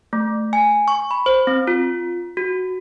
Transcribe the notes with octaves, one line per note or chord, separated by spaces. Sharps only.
A3
G#5
C#6
B5
C5
C4
F4
F#4